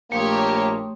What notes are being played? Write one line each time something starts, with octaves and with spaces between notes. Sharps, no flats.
A#1 A3 A#3 G4 C#5 C6 D#6